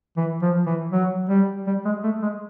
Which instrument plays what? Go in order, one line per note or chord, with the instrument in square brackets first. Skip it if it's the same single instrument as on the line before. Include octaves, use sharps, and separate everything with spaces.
[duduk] E3
F3
E3
F#3
G3
G3
G#3
A3
G#3